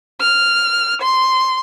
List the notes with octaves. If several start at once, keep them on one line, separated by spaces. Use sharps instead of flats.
F6
C6